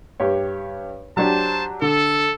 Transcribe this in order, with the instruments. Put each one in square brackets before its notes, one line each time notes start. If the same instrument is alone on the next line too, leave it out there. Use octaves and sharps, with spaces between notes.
[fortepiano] G2 G4 C#5
[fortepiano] F#3 D4 G4 [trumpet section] C5 A5
[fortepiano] D3 [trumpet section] A4